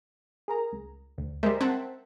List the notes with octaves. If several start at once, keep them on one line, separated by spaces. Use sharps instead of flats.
G#4 A#4 A#5
C#2
D2
G3 G#3 A#4 C5 E5
C4 F#5 A5